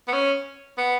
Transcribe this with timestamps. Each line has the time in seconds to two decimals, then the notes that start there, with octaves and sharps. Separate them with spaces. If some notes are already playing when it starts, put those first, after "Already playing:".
0.08 B3
0.13 C#4
0.78 B3